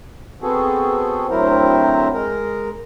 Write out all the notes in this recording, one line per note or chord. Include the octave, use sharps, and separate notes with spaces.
B3 C4 F#4 G#4 A4
D2 F#3 C4 E4 A#4 C5
G#3 A#4